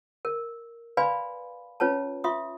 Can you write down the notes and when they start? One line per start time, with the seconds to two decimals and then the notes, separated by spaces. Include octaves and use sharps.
0.25 A#4
0.97 B4 D5 F5 G#5 B5 C6
1.80 C#4 F4 B4 C#5 A5
2.24 F4 E5 C6 D#6